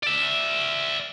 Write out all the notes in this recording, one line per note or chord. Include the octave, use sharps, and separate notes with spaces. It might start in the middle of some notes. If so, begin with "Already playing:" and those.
D5 E5